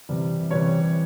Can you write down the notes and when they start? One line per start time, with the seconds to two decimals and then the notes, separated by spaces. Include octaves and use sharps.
0.09 C3 E3 G3
0.50 C3 E3 G3 C#5